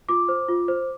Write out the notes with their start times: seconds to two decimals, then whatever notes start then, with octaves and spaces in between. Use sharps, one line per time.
0.09 F4 D6
0.28 C5
0.48 F4
0.68 C5